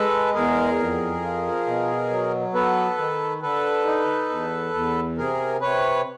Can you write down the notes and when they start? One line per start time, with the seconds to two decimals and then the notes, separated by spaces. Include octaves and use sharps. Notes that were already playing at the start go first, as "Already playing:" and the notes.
Already playing: G#3 A4 B4
0.34 E2 G#4 A#4
0.79 F2
1.22 F3
1.67 B2
2.10 F#3
2.54 B3 A4 B4
2.98 D#3
3.42 D3 A4 B4
3.86 D#4
4.29 E2
4.74 E2
5.17 C3 G#4 A#4
5.61 C3 B4 C#5